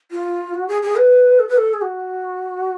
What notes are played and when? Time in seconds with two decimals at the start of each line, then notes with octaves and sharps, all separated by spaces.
0.11 F4
0.54 F#4
0.68 G#4
0.82 G#4
0.97 B4
1.39 A4
1.49 B4
1.57 A4
1.73 G#4
1.82 F#4